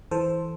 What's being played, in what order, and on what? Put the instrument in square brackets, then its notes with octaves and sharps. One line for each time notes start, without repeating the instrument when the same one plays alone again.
[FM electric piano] E3 A4 C5